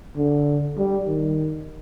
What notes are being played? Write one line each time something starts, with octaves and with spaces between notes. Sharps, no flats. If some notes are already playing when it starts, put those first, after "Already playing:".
D3
G3
D#3